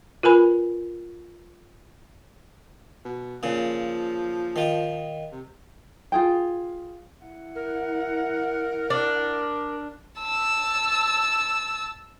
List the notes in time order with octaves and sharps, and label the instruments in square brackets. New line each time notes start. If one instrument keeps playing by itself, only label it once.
[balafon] F4 A#4 B4 G#5 B5
[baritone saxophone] B2
[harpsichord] A#2 C#3 [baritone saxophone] F3
[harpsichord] D#3 F4
[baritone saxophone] C3
[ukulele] F4 G#4 G5
[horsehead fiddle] E4 F#5
[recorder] A#4
[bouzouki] D4
[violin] A5 E6